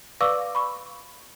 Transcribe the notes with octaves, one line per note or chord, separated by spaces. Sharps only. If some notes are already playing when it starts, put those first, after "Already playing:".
B4 D5 F5 C#6 D6 E6
B5 C#6